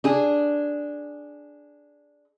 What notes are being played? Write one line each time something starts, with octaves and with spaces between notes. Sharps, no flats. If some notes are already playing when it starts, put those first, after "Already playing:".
D4 G#4